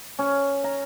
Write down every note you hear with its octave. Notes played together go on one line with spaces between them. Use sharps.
C#4
A#5